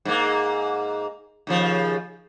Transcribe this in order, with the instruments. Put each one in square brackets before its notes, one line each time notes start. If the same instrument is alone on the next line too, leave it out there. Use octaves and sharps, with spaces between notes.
[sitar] G#2 A#3
D#2 C#3 F3